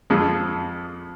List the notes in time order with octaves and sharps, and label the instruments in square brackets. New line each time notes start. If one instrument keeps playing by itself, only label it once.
[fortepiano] F2 F3 G#3